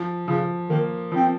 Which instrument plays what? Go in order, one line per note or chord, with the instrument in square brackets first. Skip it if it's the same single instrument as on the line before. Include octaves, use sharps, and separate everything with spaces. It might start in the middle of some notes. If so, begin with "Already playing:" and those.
Already playing: [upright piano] F3
[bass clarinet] C#3 [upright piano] F3
[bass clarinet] D#3 [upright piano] A#3
[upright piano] F3 [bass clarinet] C4